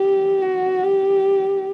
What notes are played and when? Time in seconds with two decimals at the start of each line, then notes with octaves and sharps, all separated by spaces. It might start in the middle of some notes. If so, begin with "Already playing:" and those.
Already playing: G4
0.42 F#4
0.84 G4